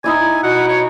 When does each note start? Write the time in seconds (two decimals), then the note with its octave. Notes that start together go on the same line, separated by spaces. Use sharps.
0.04 D#4 E4 D5 G#5
0.43 B2 F#5
0.68 C#5